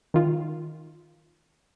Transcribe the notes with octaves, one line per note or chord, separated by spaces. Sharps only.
D#3 F4